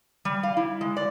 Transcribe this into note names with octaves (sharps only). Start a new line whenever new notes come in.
G3
F5
E4
G#3
D5